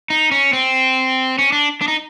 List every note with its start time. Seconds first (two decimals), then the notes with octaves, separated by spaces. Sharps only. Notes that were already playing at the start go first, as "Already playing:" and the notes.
0.10 D#4
0.31 C#4
0.53 C4
1.39 C#4
1.52 D4
1.81 D4
1.88 D#4